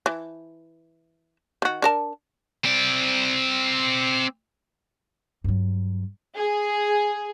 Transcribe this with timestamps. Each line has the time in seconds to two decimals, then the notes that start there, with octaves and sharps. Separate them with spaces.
0.06 E3
1.62 D#3 F#4
1.82 D4 A#4 A5
2.64 C4 D5
5.44 G2 F#3
6.37 G#4